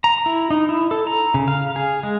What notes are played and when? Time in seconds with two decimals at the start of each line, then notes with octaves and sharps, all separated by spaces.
0.04 A#5
0.26 E4
0.51 D#4
0.69 E4
0.91 A4
1.07 A#5
1.34 C#3
1.48 F5
1.76 G#4
2.03 G#3